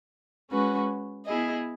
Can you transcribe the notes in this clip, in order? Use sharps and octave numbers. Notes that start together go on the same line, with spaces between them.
G#3 C#4 F#4 B4
B3 E4 G#4 D#5